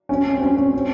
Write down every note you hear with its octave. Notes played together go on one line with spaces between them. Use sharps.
C#4
C4
C#4
C#4
C4